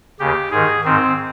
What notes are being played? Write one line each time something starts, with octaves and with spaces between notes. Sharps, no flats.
D#2 C#3 G4
G#2 D#3 G#4
G#2 D#3 C4